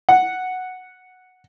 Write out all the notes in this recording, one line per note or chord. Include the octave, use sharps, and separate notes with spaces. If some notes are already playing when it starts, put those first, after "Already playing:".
F#5